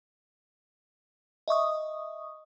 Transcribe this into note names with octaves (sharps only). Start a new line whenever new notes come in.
D#5 E5 C#6 D#6